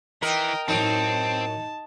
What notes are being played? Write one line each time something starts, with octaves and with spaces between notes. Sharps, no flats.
E3 A#4 D#5 G5
F#2 A2 C4 D#4 A5